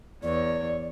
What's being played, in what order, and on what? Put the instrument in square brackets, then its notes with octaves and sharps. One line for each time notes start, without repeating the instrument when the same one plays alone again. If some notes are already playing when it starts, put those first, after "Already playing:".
[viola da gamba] E2 C#5 [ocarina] D5